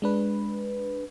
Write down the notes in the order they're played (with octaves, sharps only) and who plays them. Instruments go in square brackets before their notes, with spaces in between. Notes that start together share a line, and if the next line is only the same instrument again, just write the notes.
[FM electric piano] G#3 D4 B4